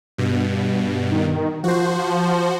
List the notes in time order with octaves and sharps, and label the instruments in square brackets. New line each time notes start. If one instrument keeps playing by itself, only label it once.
[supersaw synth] G2 B2
[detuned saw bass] D#3
[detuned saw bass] F3 [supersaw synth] F#4 C5